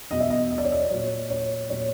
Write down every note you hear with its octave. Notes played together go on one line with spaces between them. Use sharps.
E2 B2 F#3 D#5
E5
D#5
D#5
D5
C#5
D5
A#2 F#3 C#5
C#5
A#2 F#3 C#5